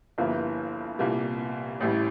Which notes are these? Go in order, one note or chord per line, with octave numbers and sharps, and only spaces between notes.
G1 G2 F3 A#3 E4
C2 A#2 G3 A#3
A1 A2 G3